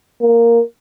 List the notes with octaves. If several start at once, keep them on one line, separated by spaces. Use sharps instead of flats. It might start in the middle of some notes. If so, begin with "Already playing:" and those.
A#3